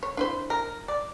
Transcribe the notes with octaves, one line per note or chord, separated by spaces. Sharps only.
C#5
D4 E4 C5
A#4
D5